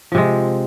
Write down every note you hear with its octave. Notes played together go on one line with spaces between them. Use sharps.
C3 F3 G#3